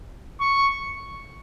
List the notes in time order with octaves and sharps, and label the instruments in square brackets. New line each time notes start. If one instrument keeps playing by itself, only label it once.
[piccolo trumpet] C#6